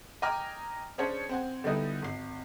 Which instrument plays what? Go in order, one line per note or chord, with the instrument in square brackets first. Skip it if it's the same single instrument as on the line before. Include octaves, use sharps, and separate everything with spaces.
[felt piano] D#5 G5 G#5 A#5 D6 F6
C#4 D4 G#4 C5 C#5 A5
C4 F#5 G#5
D3 G3 B3 D#4 E4 A4
G#1 C7